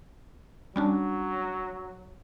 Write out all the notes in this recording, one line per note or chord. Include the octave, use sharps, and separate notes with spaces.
F#3 G3 C#4 D4